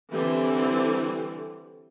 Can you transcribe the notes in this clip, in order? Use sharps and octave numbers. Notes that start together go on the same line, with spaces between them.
D3 E3 G3 C4